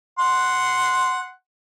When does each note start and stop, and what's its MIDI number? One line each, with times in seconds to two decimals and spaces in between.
0.19 1.31 78
0.19 1.31 84